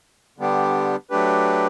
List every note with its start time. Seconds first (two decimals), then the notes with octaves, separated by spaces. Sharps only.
0.38 D3 G3 B3 D4 G4
1.10 F#3 A3 D4 G4 B4